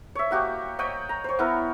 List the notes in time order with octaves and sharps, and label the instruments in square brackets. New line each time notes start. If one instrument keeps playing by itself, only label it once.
[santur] C#5 E5
A#3 F#4 G4 G5
C#5 D#5 F#5 G5
A#5
C5 C#5
B3 E4 A#4